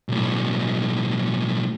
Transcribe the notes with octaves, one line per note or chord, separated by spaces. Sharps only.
B1 A2